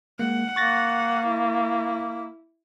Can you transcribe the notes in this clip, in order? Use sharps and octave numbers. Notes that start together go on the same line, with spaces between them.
G#3 A#3 F#5
A#3 C#6 A6 A#6
E4